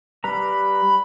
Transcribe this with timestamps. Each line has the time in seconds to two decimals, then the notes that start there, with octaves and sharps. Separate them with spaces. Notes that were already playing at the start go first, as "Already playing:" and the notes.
0.24 G3 B4 A#5 B5